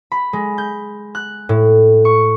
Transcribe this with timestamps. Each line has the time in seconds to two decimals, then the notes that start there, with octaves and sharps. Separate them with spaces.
0.12 B5
0.33 G#3
0.58 G6
1.15 F#6
1.49 A2
2.05 C#6